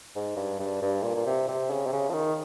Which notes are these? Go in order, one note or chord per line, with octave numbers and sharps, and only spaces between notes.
G#2
G2
G2
G2
A#2
A#2
C3
C3
C#3
C3
C#3
F3
D#3